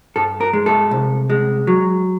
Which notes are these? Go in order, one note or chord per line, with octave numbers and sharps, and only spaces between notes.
G2 A4
A#4
G#3
A4
C2
G#3
F#3